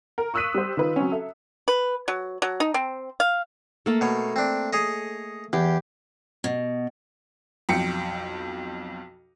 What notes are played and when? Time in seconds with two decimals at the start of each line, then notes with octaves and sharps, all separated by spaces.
0.18 A#4
0.34 C#6 D#6 E6 F#6 B6 D#7
0.55 G3 C5
0.77 D#3 F4 B4
0.96 F#3 C4 C#4
1.12 A4 E5
1.68 B4
2.08 F#3
2.42 F#3
2.60 D#4
2.74 C4
3.20 F5
3.86 A3 A#3 A4
4.01 B2 C#5
4.36 C4 D4
4.73 G#4 C#5 D#5
5.53 E2 G4
6.44 B2
7.69 B1 F2 G5 C#7